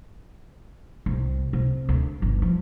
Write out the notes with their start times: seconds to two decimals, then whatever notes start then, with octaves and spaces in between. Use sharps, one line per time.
1.06 C2
1.53 C3
1.89 D2
2.22 G1
2.42 F3